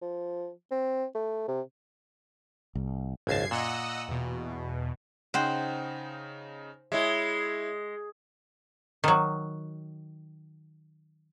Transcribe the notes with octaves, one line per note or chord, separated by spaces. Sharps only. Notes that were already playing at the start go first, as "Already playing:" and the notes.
F3
C4
A3
C3
C2
G#1 C#2 F#2 A5 G#6 C7
A#2 D#5 F#5 E6
E2 B2
C#3 D#4 C5 F#5 G5
G#3 E4 C#5 E5
D#3 F#3